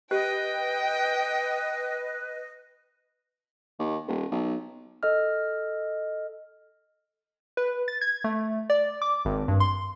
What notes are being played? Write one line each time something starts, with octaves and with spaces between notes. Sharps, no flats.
G4 B4 D#5 G5
D#2
D#1
B1
A4 D#5 F6
B4
A6
G#6
A3
D5
D6
G#1
G2
C6